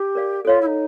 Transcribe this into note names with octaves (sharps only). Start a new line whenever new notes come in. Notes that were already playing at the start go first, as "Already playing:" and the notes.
Already playing: G4
A#4 D5 F5
F4 A4 C#5 F5
E4
D#4